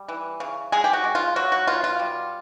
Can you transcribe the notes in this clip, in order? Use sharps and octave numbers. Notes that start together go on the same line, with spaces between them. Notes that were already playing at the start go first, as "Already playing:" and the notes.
Already playing: G3
E3
C#3
G#3 G#4
G4
F#4
G#3
F4
F#3 F#4
F#4
B2 F4
F4
G3